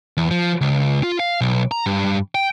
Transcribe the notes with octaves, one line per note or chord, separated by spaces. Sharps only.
E2
F3
C#2
F4
F5
B1
A#5
G2
G5